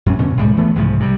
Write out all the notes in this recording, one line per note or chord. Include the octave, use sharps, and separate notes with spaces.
F#2 C#4
B2 D3 C#4
C2 A2 G3 G#3
E3 A3 B3
C2 G#2 C#3 F3
C3 G3